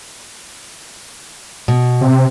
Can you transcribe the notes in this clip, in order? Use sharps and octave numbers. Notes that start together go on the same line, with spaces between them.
B2
C3